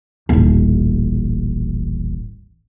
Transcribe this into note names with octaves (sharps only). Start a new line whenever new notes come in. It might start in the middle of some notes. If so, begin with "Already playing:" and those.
D#1 A1